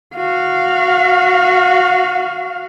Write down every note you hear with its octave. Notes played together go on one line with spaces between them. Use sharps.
F#4 F5